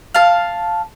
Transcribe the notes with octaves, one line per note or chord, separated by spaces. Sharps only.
F5 A5